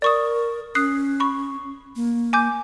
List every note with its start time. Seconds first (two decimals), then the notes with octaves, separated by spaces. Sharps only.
0.02 A#4 D5 C#6 D#6
0.75 C#4 D#6 F#6 C7
1.20 B5 C#6
1.96 A#3
2.33 G#5 D6 G6